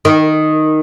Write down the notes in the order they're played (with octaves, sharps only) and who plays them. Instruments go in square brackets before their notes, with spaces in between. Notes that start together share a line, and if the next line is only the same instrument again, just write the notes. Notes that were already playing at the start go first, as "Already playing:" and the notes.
[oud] D#3